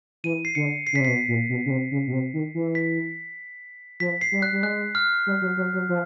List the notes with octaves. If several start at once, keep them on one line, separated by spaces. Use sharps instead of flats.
E3 D#7
C7
D3 C#7
C7
C#3
B6
C3
B2 C7
A#2
B2
C#3
C3
C#3
B2
C3
D#3
E3
B6
F3 B6
C7
G3
F#6
G3
G#3 F#6
F6
G3
F#3
F#3
F#3
F3